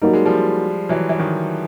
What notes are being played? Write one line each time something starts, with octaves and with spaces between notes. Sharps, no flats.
F#3 G3 A#3 D#4
G#3
F3 G3
E3 F#3
E3
D#3